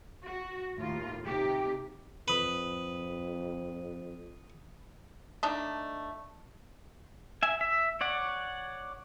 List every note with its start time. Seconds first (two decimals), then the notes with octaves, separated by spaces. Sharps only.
0.24 F#4
0.79 D#2 A2 F4
1.25 C3 D#4 G4
2.28 F2 B4 B5 D#6
5.43 A3 D4 D#4
7.43 E5 G#5
7.61 E5
8.01 C#5 D5 F#5